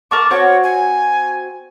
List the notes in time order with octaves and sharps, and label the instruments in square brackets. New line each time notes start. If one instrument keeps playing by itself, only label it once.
[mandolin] A#4 C#6 D6 [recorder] A5
[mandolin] C4 F#4 [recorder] C#5
[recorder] G#5